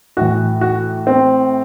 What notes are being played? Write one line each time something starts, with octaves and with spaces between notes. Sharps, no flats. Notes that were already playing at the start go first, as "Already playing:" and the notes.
A2 E3 F#4
F#4
C4